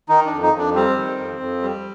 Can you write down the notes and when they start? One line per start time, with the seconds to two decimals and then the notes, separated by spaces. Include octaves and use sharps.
0.09 D#3 D#4
0.26 F2 D4
0.43 D#4
0.53 F2 D4
0.74 G3 C4
0.97 D#3
1.18 F2
1.40 F2
1.62 G3